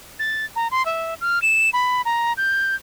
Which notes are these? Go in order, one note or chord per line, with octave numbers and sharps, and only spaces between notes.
A6
A#5
C6
E5
F6
E7
B5
A#5
G6